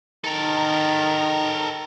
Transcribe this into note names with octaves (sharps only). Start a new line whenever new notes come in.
D#3 A4 A#4